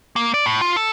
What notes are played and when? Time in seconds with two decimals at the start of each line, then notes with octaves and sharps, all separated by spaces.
0.16 A#3
0.34 D5
0.46 A2
0.61 F4
0.76 A4